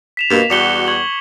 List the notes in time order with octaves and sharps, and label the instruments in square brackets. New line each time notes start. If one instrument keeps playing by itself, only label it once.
[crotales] B6 E7 F7
[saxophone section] G2 B2 A#3
[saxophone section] E2 G3 F#4 [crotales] D6 C#7 G7
[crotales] C#6 G#6 F#7